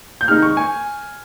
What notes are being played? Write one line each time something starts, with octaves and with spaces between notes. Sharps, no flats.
G6
C3 D#3 G#3 D#4 F6
C#6
G#5